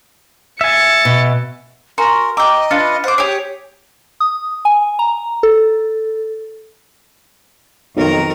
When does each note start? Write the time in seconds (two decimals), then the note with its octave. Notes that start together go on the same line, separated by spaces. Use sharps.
0.61 E5 G#5 A6 C#7
1.05 B2
1.98 F#4 A#4 G#5 A#5 C6
2.37 D#5 G5 A#5 D6 E6
2.71 D4 F4 B4 F6 A6 C#7
3.04 C5 F#5 D6
3.18 G4 G#4 C#5 D7
4.20 D#6
4.65 G#5
4.99 A#5
5.43 A4
7.96 B1 F2 D#3 A#4